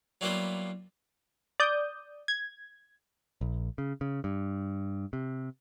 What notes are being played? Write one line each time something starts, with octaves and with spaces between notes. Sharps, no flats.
F#3 G3 A#3 B3 E4 F4
D5 D#6 G6
G#6
A#1
C#3
C#3
G2
C3